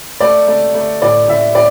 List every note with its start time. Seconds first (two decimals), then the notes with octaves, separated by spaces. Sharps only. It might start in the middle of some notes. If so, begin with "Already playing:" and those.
0.20 A3 D5
0.47 A3
0.75 A3
1.02 A2 D5
1.28 A2 E5
1.55 A2 D5